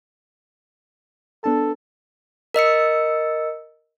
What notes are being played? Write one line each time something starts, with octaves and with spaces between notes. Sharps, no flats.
B3 D4 A4 A5
A#4 D#5 E6 C#7